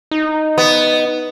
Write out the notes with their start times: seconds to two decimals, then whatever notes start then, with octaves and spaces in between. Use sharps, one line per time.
0.11 D#4
0.58 B3